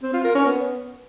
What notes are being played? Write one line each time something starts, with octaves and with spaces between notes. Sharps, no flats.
C4
F4
A#4
C#4
B3